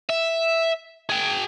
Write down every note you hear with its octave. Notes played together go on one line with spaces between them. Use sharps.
E5
G#4 G5